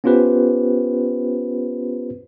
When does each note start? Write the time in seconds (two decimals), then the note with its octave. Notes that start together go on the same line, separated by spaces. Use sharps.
0.04 B3 C#4 F4 G4 B4 C5